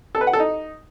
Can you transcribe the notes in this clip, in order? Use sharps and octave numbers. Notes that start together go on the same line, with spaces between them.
A4
B4
F#5
A4
D#4